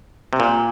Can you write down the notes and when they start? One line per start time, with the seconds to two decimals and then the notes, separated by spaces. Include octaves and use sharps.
0.33 C3
0.40 A#2